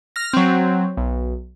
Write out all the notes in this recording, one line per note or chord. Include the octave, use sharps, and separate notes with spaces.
F6 A#6
F#3 C4
B1